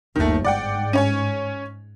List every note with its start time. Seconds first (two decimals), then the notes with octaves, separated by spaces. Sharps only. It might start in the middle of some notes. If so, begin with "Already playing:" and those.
0.16 G1 D#2 D#3 A3
0.45 G#2 D5 F#5 G5
0.93 C#4 C#5 G#5